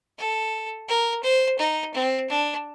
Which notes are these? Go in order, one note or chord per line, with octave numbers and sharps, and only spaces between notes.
A4
A#4
C5
D#4
C4
D4